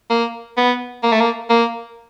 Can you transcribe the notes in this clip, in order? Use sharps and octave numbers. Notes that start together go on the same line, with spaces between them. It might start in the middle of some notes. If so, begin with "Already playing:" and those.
A#3
B3
A#3
A3
A#3
A#3